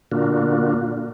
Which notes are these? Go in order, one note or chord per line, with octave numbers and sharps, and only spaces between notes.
A#2 D3 A#3 D4 F4 F#4